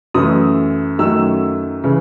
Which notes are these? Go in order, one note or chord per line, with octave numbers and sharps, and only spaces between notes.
F#2 E3 A3 D#6
F#2 D#3 F#3 A3 E6
C#3 E3